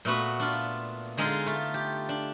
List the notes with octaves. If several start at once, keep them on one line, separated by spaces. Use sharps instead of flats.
A#2 A3 B3 F#4 B4
D4 F4
D3 G#3 D#4 F4 G#4
A3 F4
G4
D4